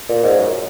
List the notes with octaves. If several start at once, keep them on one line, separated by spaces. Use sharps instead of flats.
A#2
G#2
F#2